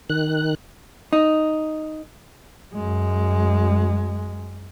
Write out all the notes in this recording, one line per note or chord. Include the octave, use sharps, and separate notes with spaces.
D#3 F#6
D#4
F#2 G#3